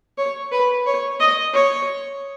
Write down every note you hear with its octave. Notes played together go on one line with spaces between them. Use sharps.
C#5
B4
C#5
D#5
C#5